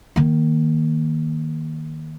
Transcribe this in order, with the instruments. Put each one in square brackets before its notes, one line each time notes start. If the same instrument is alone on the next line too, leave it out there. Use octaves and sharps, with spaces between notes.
[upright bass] D#3 A#3